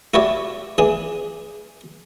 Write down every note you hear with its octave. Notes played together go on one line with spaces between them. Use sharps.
E4 F#4 G4 C#5 D5 E5
E3 D4 G#4